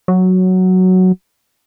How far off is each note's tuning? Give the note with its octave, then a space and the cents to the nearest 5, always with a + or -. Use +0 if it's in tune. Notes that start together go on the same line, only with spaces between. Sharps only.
F#3 +0